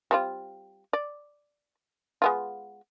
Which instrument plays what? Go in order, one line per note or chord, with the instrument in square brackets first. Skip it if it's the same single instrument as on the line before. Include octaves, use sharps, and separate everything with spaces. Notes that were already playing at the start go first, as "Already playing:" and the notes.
[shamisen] G3 C4 F4
D5
G#3 B3 F4